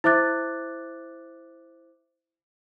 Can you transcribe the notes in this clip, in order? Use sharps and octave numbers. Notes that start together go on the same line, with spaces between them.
E4 C5 E5 D6 F#6 A6